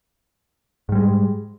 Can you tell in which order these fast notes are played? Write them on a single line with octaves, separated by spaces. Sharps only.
G#2 G3 G#3